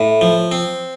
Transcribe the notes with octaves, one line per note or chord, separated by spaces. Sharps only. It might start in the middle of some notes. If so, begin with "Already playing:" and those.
Already playing: A2
F3
C4